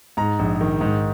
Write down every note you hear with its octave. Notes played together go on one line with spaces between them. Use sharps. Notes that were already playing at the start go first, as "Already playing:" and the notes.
G#2 A#5
A#1
D#3
G#2